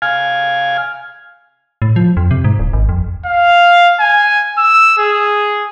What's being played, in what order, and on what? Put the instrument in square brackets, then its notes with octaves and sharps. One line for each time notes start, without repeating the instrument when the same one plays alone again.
[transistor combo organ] F5 G#5
[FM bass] A2
F3
F2
C3
G#2
D1
G#1
F2
[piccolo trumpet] F5
G#5
E6
G#4